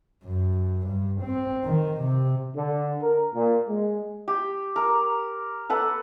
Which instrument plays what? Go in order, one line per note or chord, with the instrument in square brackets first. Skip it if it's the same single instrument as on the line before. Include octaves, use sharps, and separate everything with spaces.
[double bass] F#2
G2
C4
D#3
C3
[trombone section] D3
A#4
A#2
G#3
[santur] G4
A#4
A4 B4 F#5